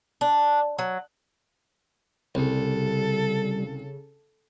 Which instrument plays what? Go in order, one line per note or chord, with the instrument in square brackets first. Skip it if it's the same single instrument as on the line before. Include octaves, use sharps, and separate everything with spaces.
[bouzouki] D4
F#3
[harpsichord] C2 [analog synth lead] C#3 [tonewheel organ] G3 [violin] A4